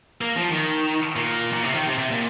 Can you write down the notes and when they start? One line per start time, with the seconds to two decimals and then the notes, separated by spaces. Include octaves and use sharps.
0.21 A#3
0.36 F3
0.52 D#3
1.16 A#2
1.53 A#2
1.63 C3
1.74 D#3
1.87 C3
1.98 C3
2.11 A#2